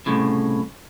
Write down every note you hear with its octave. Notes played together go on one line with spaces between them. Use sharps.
C2 A2 C#3